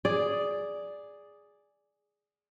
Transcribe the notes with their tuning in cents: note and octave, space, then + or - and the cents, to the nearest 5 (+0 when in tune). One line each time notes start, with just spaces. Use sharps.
G#4 +0 D5 +0